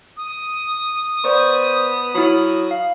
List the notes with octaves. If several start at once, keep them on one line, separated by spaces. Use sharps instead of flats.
D#6
B3 C5 D5 C#6
F#3 E4 B5
F5